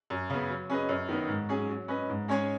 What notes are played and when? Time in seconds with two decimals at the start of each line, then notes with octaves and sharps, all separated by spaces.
0.10 F#2
0.30 C#3 B3
0.50 F#3
0.70 C#4 G#4 B4 D#5
0.89 F#2
1.09 D#3 B3 D#4
1.29 G#2
1.49 F#3 C#4 G#4
1.69 F#3
1.88 C#4 B4 D#5
2.09 G#2
2.28 G#3 C#4 G#4 C#5